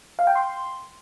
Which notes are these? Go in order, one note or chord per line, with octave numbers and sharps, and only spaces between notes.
F5
G5
C6